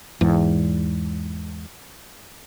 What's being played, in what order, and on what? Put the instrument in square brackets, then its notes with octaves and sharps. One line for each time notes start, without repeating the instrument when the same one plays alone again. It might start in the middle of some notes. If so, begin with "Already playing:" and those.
[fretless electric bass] E2 G#2